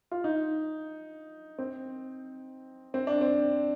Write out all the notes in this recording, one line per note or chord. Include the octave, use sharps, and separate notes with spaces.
F4
D#4
C4
C4
D4
C4